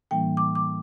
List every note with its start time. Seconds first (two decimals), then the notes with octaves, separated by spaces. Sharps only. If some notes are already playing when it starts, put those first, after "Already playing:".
0.11 A2 E3 G3 A#3 D4 G5
0.37 D6
0.55 D6